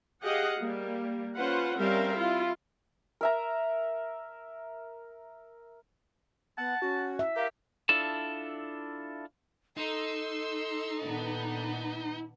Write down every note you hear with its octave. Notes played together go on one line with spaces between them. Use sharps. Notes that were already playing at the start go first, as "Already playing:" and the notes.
G4 G#4 D#5 F5 F#5
G3 A#3
C#4 F4 B4 C5 F#5
G3 C4 C#4 A#4 E5 F5
E4 F4
A#4 E5 A#5
B3 F#5 A5
C#4 F#4
E5
G4 A#4 F5
D4 E4 F4 A4 A5
D#4 A4 C6 E6
A#2 D#3 B3 D4